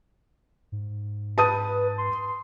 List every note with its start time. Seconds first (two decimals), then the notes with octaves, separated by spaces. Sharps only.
0.72 G#2
1.38 B4 A5 D#6 D#7
1.98 C6